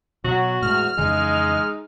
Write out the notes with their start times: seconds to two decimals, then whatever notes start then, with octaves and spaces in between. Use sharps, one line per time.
0.24 B2 F#3 B3 F#4
0.62 E2 A2 G#3 F6
0.97 F2 C#3 E3 G#3 D#4